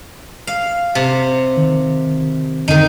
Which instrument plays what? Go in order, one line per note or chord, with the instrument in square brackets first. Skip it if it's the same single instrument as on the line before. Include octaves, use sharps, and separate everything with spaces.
[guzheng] F5
C3
[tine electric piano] D#3
[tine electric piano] F2 D3 [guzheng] D#3 D#4